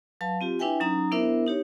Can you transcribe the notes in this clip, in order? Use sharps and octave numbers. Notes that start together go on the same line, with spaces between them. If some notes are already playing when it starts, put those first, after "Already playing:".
F#3 B4 F5 A5
C4 F4 G4
D4 E4 B4 E5 G5 G#5
F#3 C#4 D#4 A#5 D#6
B3 D4 E4 A#4 C5 E5
D#4 G4 C#5